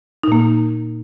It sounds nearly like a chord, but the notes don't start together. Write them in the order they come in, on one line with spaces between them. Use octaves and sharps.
D#4 A#2 A#3